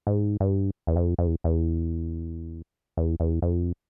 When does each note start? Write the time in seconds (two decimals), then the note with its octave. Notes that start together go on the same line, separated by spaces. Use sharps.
0.07 G#2
0.40 G2
0.87 E2
0.96 F2
1.18 F2
1.27 E2
1.44 E2
2.97 E2
3.20 E2
3.42 F2